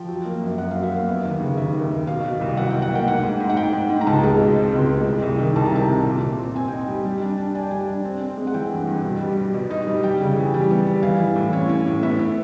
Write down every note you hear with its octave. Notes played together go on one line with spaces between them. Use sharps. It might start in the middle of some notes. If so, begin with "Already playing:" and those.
Already playing: F3 G5
F#3
A#3
F#2
F#2 F#5
F#3 F5
E5
A#3 F5
B3
D#2
C#3
D#2 E5
D#2
D#2
B2 F5
B2
C2
F#3 F#5
B2 G5
F#5
A#3 G5
G#2 F#5
G#2
G#2
F#5
G#2 G5
G#2
G#2
A#5
C#2 A5
G#3
B2
C4
C#2
G#3
C2
C2
D#3
C2 A5
A#5
C3 A5
C3
A#2
A#2
C4
C4 G#5
D#4 G5
G#5
G3
G3
D4
D4
D4 G#5
G5
G3 G#5
D4
C4
C4
G#3
F#5
E3 G5
G2
G2
B2
G3
G3
B2
D#4
G3
G3 G5
C#3
E3
G3
B3
G3
E3 F5
E3
A2
C#4
C#4
A2
B3 E5
B3